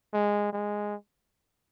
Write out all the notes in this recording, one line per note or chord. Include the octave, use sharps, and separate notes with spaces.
G#3
G#3